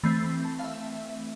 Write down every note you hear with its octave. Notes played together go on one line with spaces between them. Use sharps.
E3 A3 C4 B5
B5
A5
F5
E5